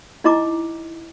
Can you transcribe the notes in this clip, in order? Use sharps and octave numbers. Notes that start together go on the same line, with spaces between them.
D#4 E4 D#5 A#5 D6